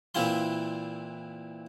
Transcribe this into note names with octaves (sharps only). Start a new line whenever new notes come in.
A#2 E3 C4 E4 F4 C6